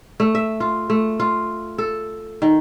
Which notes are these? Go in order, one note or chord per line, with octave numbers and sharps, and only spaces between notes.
A3
E5
F4
A3
F4
A4
D#3